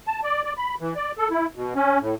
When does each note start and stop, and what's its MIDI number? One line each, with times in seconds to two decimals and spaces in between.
0.07 0.20 81
0.24 0.42 74
0.45 0.53 74
0.57 0.75 83
0.80 0.94 52
0.96 1.12 74
1.18 1.28 69
1.31 1.46 64
1.56 1.74 47
1.76 1.99 61
2.00 2.14 45